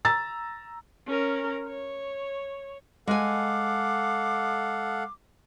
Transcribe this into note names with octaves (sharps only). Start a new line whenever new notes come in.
A#5 E6 A6
C#4 A#4
C#5
G#3 A4 F5 F#5 G#5 D6